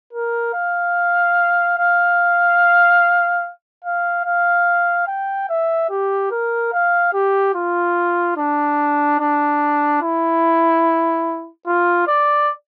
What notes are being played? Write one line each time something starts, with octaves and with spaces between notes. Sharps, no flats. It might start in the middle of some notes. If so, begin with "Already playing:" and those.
A#4
F5
F5
F5
F5
G5
E5
G4
A#4
F5
G4
F4
D4
D4
E4
F4
D5